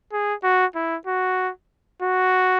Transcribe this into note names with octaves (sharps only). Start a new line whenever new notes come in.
G#4
F#4
E4
F#4
F#4